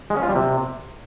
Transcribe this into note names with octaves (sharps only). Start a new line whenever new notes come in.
G#3
C#4
F4
G3
C3